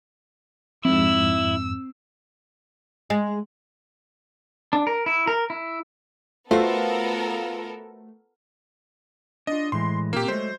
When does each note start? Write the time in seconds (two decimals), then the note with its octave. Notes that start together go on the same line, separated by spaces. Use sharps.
0.85 F2 G#2 C4 E4 E6
3.10 G#3
4.73 D4
4.87 A#4
5.06 E4
5.27 A#4
5.50 E4
6.51 A3 B3 F4 F#4 A4 A#4 C5
9.47 D4 F4 D#5
9.72 A2 E3 G#3 C6
10.13 A#2 A#3 C4 F4 G4
10.28 F#3 G#3 A3 C5